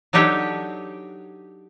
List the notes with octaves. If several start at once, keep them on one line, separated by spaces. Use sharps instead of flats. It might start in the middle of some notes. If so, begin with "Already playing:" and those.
F#3 D4 D#4 G4 A4 C#5